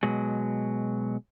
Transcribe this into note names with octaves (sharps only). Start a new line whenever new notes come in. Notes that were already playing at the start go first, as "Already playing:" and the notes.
B2 F#3 G#3